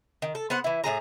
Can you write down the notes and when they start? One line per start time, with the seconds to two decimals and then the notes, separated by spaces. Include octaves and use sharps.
0.22 D#3
0.35 A4
0.50 B3 C5 F#5
0.64 E3 E4
0.84 A2 F3 G#4 A#5